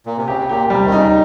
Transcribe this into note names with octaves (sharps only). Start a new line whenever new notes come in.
A#2
C3
C#3 G4
A#2 G4
C3 G3
D#3
C#3 D#4